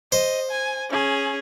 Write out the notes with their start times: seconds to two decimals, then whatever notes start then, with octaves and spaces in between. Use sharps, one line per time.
0.12 C5 D#5
0.51 G#5
0.90 C#4 G#4